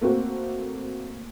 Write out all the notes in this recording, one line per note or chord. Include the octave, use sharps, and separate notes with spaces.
A3 A#3 C4 F#4